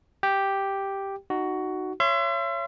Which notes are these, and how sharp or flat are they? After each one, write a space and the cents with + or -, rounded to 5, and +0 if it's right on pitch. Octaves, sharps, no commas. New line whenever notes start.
G4 +0 G5 +0
D#4 -10 F#4 +10
C#5 +0 E5 +40 C6 -10